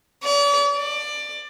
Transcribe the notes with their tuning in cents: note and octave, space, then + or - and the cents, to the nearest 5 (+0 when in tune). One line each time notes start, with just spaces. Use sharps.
D5 -45
D5 +20